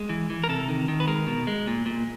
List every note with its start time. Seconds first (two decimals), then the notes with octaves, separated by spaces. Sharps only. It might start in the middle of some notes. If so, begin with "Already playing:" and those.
Already playing: G#3
0.09 E3
0.30 E3
0.44 A#4
0.49 C3 A4
0.68 D#3
0.88 D#3
1.00 B4
1.07 G#3 A#4
1.27 B2
1.47 G#3
1.67 A#2
1.86 A#2